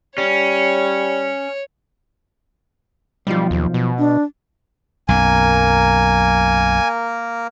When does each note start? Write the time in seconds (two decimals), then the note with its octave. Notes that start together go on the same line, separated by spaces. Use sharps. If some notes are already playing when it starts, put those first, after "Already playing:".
0.18 G3 C#4 C#5
3.27 B1 F3 G3
3.51 D#2
3.74 B2
3.98 D4
5.09 B1 F#2 A#3 A#4 G#5